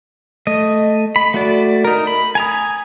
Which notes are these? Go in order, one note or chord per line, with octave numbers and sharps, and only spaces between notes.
A3 D#5
B5
A3 F#4 D5
D#4 A#4
B5
G#5 A#5 D#6